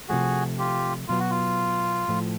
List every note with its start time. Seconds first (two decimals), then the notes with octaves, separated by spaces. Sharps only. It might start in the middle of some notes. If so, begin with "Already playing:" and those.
0.09 C3 F3 A3 F#4 G#4
0.58 F4 G4
1.08 B2 F#3 B3 F4
1.20 F#4
1.31 F4
2.08 A2 F3 A3